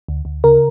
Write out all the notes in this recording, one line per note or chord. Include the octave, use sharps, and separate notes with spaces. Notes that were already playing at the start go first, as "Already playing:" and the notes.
D2
D2
C#3 A#4